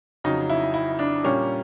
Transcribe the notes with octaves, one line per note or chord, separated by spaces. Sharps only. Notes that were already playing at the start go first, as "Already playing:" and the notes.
F2 C#3 F#3 D#4
E4
E4
D4
A#2 G3 A#3 C#4